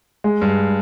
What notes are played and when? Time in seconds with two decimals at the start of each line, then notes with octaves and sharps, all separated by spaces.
0.24 G#3
0.42 G2